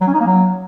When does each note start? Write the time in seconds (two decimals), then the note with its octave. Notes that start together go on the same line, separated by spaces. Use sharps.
0.01 F#3
0.07 C#4
0.14 D#4
0.20 A#3
0.26 F#3